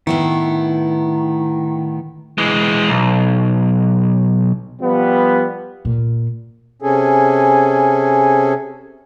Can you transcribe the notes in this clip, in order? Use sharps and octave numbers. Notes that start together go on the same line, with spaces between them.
A2 D#3 B3 E4
E3 G#3
B1
F3 G3 B3
A#2
C3 C#4 G#4 A4